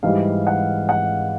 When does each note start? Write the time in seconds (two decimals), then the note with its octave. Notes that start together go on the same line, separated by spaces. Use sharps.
0.03 G#2 E3 G3 F5
0.47 F#5
0.89 F#5